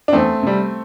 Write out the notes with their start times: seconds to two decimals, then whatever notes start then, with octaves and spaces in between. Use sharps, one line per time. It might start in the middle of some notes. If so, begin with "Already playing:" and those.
0.08 D4
0.13 E2 A3 C4
0.43 C3 G3